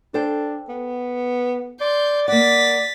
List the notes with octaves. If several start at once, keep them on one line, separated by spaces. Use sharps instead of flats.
D4 A4 C5 G5
B3
D5 C6 G6
A#3 D5 F#5 A6 B6